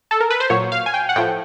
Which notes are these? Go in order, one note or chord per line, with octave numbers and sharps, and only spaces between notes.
A4
A#4
B4
C5
A#2 F#3 C#5
F5
G#5
G5
F#5
A2 F3 G5